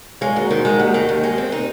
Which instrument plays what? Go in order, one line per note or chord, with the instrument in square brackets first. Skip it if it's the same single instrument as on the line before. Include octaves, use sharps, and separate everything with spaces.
[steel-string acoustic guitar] G#3 [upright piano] C#5 F5
[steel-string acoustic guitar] D#2 [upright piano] F#4 A#4
[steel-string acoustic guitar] D#3 [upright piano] C5
[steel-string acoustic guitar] G#3 [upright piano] F#4 A#4
[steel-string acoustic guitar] D#2 [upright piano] D#5 F#5
[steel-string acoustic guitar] D#3
D#2
G#3
C4
D#4